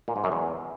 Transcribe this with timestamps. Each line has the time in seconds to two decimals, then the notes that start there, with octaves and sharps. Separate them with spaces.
0.08 A#2
0.16 G#2
0.24 F#2
0.32 E2